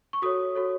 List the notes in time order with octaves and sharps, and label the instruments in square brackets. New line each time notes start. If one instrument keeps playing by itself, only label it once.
[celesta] C#6
F#4 A4 C#5 D#6
F#4 A4 C#5